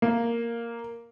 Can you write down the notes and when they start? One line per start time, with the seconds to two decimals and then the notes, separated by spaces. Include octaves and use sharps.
0.02 A#3